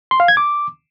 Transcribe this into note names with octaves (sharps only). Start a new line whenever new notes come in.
C6
F5
G#6
D6